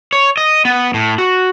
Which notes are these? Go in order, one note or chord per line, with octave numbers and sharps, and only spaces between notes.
C#5
D#5
B3
A2
F#4